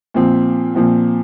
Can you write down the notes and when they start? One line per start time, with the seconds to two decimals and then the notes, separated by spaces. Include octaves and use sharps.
0.14 A#2 F3 C4
0.75 A#2 F3 C4